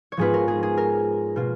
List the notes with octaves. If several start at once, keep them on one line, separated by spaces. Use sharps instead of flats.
C#5
G#2 F3 B3 F4 G#4 B4
A#4
G#4
G#4
A#4
B2 A#3 F4